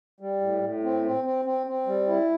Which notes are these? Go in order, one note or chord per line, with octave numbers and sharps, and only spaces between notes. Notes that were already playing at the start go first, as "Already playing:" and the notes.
G3
A2
A2
C4
C4
C4
C4
C4
G3
E4